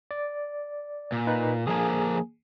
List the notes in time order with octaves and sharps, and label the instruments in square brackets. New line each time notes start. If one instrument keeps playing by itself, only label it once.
[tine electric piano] D5
[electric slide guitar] A#2
[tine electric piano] D#4 B4
[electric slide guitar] D3 F3 A#3 [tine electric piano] G#4 G#5